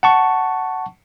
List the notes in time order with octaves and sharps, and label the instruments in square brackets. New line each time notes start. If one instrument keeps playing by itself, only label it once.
[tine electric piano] F#5 A5 C#6